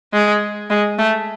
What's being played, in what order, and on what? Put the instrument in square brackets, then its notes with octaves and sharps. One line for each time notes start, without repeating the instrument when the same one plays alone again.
[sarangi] G#3
G#3
A3